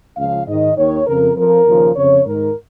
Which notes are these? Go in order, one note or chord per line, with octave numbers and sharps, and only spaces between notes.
C#2 C#3 F3 F5
G#2 D#3 D#5
D#2 D#3 C#5
F2 C#3 F3 A#4
F2 F3 A#4
D#2 C#3 F3
F2 C#3 F3 C#5
G#2 D#3 A#4